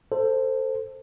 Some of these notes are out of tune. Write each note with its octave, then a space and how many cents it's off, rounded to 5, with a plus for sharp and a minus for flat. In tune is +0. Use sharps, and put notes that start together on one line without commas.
A4 +20 C5 +0